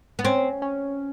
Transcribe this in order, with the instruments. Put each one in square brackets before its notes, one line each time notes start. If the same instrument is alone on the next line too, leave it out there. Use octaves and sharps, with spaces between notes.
[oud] B3
[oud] C4 [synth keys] C#4
[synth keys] C#4